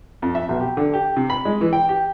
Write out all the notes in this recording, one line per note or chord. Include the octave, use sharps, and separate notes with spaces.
F2
E5
B1
G4
D3
G4
C3
B5
G#3
E3
G5
G4